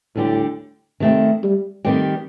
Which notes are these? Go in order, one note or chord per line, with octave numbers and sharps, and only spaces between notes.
D2 A2 D3 G3 D4 G4
C3 D#3 A3 C4
G3
D#3 G3 A3 C4 G4